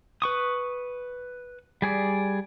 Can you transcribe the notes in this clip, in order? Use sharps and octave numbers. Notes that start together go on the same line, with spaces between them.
B4 C#6 D#6
G3 G#4 D5